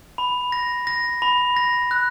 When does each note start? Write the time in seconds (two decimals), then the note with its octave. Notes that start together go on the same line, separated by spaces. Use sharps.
0.18 B5
0.52 A#6
0.87 A#6
1.22 B5
1.56 A#6
1.91 F#6